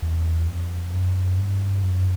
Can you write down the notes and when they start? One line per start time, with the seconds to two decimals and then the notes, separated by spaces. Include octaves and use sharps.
0.02 E2
0.48 F2
0.93 F#2
1.38 G2
1.83 F#2